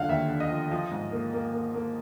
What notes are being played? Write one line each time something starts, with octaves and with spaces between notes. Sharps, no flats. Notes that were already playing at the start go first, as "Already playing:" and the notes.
Already playing: D3 F3 A3 F5 F#5
D#2 E5
D3
D#5
F3
F3
G#2
A#3
A#3
A#3
A#3